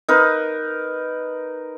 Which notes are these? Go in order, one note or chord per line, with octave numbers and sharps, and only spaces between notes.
D#4 A#4 B4